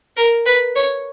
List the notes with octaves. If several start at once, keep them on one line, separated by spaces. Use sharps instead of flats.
A#4
B4
C#5